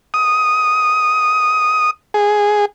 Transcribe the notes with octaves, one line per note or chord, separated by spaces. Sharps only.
D#6
G#4